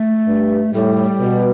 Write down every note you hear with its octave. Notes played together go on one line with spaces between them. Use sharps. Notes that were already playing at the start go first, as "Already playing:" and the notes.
Already playing: A3
G2
A2 G3
B2